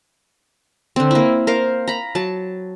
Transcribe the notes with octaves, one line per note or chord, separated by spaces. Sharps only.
D3 C4
A#3 E4
A#4 C5 F5
A#5 B5
F#3 A5